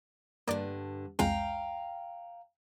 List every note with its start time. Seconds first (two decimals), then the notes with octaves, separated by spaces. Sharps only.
0.48 G2 D3 A#3 D5
1.19 C2 F2 G#3 F5 G5 A#5